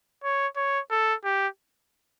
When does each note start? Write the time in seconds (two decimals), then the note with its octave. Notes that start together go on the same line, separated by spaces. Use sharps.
0.24 C#5
0.56 C#5
0.91 A4
1.24 G4